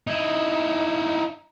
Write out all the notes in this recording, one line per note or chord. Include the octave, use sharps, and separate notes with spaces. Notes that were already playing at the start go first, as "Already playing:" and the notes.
D#4 E4